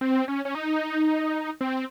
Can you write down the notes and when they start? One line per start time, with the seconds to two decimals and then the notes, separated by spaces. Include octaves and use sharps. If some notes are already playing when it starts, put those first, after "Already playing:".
0.01 C4
0.28 C#4
0.45 C#4
0.55 D#4
1.61 C4